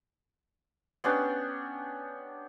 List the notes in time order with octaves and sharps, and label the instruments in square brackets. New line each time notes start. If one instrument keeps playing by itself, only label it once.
[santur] B3 C#4 D4 G4